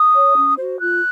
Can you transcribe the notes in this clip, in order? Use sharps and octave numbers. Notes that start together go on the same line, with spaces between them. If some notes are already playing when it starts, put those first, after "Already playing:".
Already playing: D#6
C#5
C#4
F#4 C5
F4 F#6